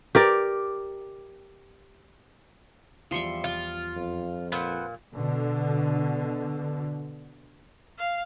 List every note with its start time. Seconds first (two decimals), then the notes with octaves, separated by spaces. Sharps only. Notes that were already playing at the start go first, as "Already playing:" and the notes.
0.15 G4 A#4 D5
3.11 E2 F3 G3 E5 C6 C#7
3.44 F4
3.96 F2
4.52 A#2 B4 C5 F#5
5.16 B2 D3
7.98 F5